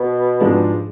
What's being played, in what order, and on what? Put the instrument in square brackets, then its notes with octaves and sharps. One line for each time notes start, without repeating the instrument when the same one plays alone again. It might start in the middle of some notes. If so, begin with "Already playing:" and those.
Already playing: [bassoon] B2
[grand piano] G#2 F3 G#3 D4